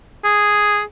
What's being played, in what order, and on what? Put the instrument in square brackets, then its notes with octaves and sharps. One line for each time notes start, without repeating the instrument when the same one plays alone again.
[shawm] G#4